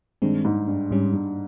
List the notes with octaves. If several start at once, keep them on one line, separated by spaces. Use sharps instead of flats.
G2 D#3 G#3 C4
G#2
G2
G#2 G3 C#4
G2